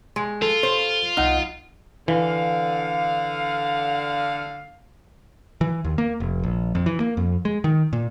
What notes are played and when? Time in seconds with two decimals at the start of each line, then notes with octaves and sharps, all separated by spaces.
0.16 G#3
0.42 F4 A4
0.63 C5
1.17 C2 D#4 F#5 F6
2.08 D3 E3 F5
5.61 E3
5.84 D#2
5.98 A#3
6.20 F1
6.43 A#1
6.75 F2
6.86 E3
7.00 A#3
7.17 F2
7.45 G#3
7.64 D#3
7.93 A#2